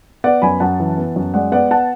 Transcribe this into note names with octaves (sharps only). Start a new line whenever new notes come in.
B3 D5 F#5
F#2 G#5 B5
F#2 F#5 A5
E3
B3
F#2
G#3 D5 F#5
B3 D5 F#5
F#5 A5